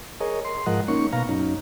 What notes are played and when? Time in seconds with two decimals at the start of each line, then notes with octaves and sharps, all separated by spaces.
0.20 G#4 A#4 C#5 D#5
0.45 C6
0.66 G#2 F3 A#4 D#5 F#5
0.88 A#3 C#4 D#4 C#6
1.13 B2 F5 A#5
1.29 F#2 C#4 D#4